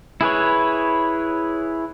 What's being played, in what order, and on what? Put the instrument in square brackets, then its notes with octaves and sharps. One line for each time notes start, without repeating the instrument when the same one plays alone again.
[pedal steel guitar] E4 G#4 B4 C#5